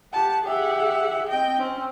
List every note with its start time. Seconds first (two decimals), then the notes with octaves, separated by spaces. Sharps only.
0.13 G4 F#5 A5
0.43 G4 G#4 E5 F#5
1.29 C4 D#5 G5
1.59 C4 C#4